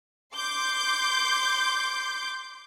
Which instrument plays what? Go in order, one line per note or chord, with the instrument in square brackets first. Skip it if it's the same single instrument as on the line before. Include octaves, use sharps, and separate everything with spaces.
[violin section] C6 D6 G6